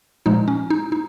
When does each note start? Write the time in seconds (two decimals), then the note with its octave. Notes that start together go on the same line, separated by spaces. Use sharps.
0.26 A#2 F3 G#3 D#4
0.48 C#4
0.70 D#4
0.92 D#4